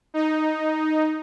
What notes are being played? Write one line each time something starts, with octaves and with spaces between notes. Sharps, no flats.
D#4